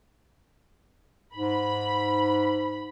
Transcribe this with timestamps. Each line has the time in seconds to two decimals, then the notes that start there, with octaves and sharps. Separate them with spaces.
1.35 G#2 B5